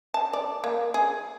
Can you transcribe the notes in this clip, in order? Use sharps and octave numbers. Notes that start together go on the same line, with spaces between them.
A5
D5
A#3
G#4